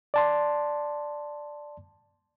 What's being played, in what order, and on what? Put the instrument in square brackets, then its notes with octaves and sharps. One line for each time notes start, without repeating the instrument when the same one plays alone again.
[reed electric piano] D5 A5 C6